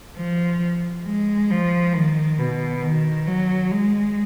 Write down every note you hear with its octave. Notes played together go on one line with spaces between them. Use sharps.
F3
G#3
F3
D#3
B2
D#3
F#3
G#3